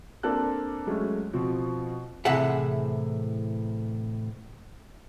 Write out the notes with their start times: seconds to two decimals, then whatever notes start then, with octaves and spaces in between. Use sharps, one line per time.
0.23 A#3 C4 D4 A4 F#6
0.87 F#3 G#3 A3 C#4
1.33 B2 F3 C4
2.25 A2 C3 E3 G#4 E5 F#5